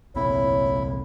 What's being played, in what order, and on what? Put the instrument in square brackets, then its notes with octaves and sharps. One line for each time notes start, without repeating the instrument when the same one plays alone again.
[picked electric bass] C2 A#2 C4 [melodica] E4 [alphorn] C#5